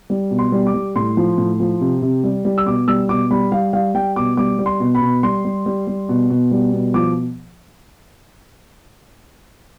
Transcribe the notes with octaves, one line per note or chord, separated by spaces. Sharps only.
G3
B2
C6
G3
D6
G3
A2 C6
F3
A2
F3
C3
C3
G3
G3
E6
B2 D6
G3 E6
B2 D6
G3 B5
G3 F5
G3 F5
G3 G5
B2 D6
G3 D6
G3
C6
B2
B5
B2
G3 C6
G3
G3
G3
B2
B2
G3
B2
F3 D6